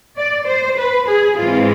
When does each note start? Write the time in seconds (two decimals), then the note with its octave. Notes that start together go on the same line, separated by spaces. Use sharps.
0.17 D5
0.46 C5
0.77 B4
1.07 G#4
1.37 G#2 E3 G#3 C4 F4